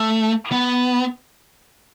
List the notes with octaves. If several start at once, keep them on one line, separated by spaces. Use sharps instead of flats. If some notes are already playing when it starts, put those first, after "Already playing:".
Already playing: A3
B3